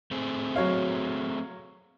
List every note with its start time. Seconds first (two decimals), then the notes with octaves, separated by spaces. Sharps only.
0.11 A3 C4 G#4
0.56 F#3 C#5 F5